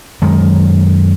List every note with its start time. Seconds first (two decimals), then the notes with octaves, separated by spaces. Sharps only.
0.22 F#2 D#3 G#3